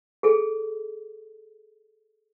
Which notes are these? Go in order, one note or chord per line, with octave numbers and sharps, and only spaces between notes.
G#4 A4